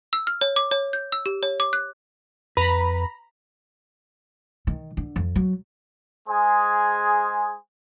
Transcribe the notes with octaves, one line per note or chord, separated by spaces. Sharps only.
E6
F6
C#5
D6
C#5
G6
E6
G4
C#5
D6
F#6
F2 B4 A#5 B5
D#3
D3
F2
F#3
G#3 G#4 C5 G#5